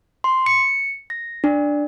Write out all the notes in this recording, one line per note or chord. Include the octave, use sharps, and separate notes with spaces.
C6
C#7
A#6
D4